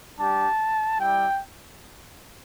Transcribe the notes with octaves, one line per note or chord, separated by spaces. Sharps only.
G3 D4 G4 A5
G3 E4 G4 G5